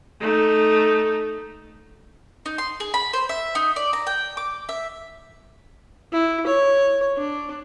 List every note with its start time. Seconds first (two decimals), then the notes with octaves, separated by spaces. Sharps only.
0.21 A3 D#4
2.46 D#4
2.58 C6
2.80 G#4
2.94 B5
3.13 C5
3.29 E5
3.55 D#4
3.76 D5
3.93 A#5
4.07 G5
4.37 D6
4.69 E5
6.13 E4
6.47 C#5
7.17 D4